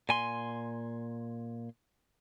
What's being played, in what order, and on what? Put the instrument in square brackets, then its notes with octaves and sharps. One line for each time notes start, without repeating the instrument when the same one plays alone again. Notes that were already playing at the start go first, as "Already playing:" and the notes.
[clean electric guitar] A#2 G#5 C6